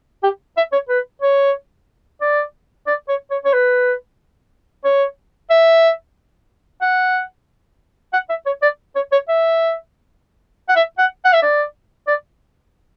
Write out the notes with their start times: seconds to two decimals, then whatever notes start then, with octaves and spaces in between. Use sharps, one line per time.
0.23 G4
0.57 E5
0.73 C#5
0.89 B4
1.22 C#5
2.21 D5
2.87 D5
3.09 C#5
3.31 C#5
3.45 C#5
3.53 B4
4.84 C#5
5.50 E5
6.82 F#5
8.13 F#5
8.30 E5
8.46 C#5
8.63 D5
8.96 C#5
9.12 C#5
9.29 E5
10.69 F#5
10.76 E5
10.99 F#5
11.25 F#5
11.33 E5
11.43 D5
12.07 D5